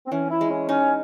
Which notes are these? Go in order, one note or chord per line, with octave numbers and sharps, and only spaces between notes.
C4
E3 C#4
E4
G#3
C#4
C#4 D#4